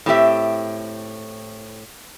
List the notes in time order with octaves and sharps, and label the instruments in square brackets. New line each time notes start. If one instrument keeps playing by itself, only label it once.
[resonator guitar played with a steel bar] A2 C4 G4 E5